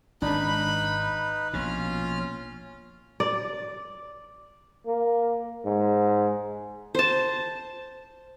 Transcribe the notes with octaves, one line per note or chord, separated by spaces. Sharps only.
G#1 G#2 D4 D#4 B4 B5
A#1 B2 C#4 F4 F6
D5
A#3
G#2
C5 A5